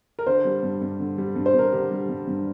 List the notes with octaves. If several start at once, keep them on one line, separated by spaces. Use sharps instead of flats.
A#4
D3 C5
G3
G2
G2
D3
G3
G2
C5
G2 A#4
D3 G4
G3
G2
G2